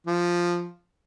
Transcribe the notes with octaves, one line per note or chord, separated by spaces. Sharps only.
F3